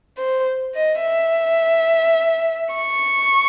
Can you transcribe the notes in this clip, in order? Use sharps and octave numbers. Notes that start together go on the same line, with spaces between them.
C5
D#5
E5
C#6